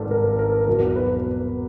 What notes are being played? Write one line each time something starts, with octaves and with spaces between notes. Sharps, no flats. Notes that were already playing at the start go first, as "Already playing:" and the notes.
Already playing: G#1 G2 A4
A#4
A#4
E2 B2 F#3 A#4
B4